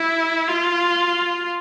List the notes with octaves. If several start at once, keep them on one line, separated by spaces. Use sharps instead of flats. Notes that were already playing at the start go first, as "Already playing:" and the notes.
Already playing: E4
F4